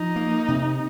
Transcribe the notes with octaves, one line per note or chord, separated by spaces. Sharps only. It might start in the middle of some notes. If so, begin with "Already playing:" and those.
Already playing: F3 D#4
A#3
C3